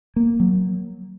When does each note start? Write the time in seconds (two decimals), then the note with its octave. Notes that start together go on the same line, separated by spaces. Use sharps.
0.16 A#3
0.40 F#3